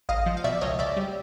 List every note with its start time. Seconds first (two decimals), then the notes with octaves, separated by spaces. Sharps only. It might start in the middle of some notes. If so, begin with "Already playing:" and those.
0.09 A1 D#5 F5
0.26 F3
0.37 F5
0.44 B2 D5 E5
0.61 C#2 C#5 D#5
0.79 C#2 D5 E5
0.96 G3